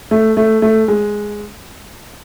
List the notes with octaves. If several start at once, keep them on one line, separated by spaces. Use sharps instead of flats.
A3
A3
A3
G#3